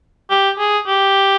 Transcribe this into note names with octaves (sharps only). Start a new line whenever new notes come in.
G4
G#4
G4